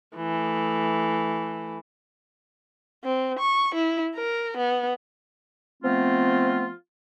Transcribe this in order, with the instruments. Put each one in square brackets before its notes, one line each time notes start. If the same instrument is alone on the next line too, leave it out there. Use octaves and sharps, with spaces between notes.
[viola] E3 A3
[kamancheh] C4
C#6
E4
A#4
B3
[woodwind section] F3 A3 B3 C4 F4